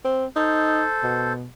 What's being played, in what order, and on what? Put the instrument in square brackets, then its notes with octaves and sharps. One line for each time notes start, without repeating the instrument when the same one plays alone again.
[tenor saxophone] C4
[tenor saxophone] D#4 [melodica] A4 C5
[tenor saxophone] B2